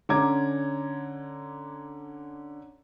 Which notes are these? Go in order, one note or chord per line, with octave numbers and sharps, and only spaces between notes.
D3 C#4 A#5 D6 G#6